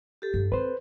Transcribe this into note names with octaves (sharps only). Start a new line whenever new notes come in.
G4 A4
G2 A4
C4 B4 C5